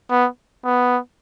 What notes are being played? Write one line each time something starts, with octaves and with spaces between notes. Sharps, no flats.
B3
B3